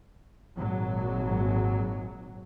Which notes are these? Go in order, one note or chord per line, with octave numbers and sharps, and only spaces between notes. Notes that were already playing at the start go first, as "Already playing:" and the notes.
G#1 A#2 F#3